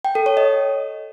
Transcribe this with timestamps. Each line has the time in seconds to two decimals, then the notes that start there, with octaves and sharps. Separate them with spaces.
0.05 G5
0.15 A4
0.26 C#5
0.37 D#5